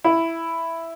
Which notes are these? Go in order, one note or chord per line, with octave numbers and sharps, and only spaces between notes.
E4